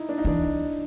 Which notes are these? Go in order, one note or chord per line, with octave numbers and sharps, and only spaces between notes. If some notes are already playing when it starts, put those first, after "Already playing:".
Already playing: D#4 E4
D4
D#4
E3 D4